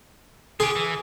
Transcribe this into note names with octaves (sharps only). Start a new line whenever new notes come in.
F4 G4 G#4
E3